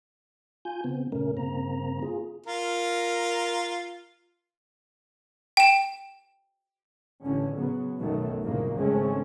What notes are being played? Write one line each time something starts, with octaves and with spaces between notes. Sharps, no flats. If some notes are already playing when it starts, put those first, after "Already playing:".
F4 G#5 G6
C#3 B3 C4
F#2 A#2 C#3 A3 C#4 A#4
G2 C#3 A#3 C4 A#5
F4 G#4
F4 A#4
G5 E7
A1 D3 C#4
C#3 F#3 B3
B1 F#2 B2 D#3 F#3 A3
G1 C2 F#2 A#2 C#3 A#3
G#1 C#3 G#3 A3 C4 C#4